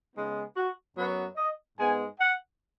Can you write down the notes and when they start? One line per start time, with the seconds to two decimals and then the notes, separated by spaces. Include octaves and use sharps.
0.14 C#3 G#3 B3 D#4
0.56 F#4
0.96 F#2 F#3 B3 B4
1.36 D#5
1.78 G#2 G#3 B3 G#5
2.18 F#5